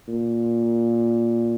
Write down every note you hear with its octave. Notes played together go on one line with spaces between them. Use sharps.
A#2